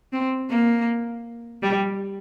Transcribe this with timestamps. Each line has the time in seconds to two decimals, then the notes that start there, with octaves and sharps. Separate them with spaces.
0.12 C4
0.50 A#3
1.63 G3